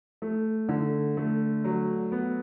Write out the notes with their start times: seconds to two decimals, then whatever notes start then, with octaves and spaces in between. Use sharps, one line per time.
0.22 A3
0.69 D3
1.17 A3
1.64 F#3
2.12 B3